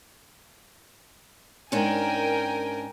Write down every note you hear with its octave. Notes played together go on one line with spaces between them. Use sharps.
G#2 C#4 D4 A#4 G5 G#5